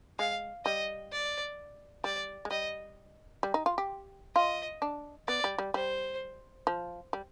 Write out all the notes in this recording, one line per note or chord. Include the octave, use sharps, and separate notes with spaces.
G#3 F5
G3 D#5
D5
G3 D5
G#3
G3 D#5
G3
D#4
F4
G4
F4 D#5
D4
B3 D5
G3
G3
G3 C5
F3
G3